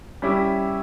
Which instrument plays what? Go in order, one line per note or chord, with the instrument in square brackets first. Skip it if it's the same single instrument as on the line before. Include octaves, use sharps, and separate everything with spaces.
[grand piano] G3 C#4 E4 G4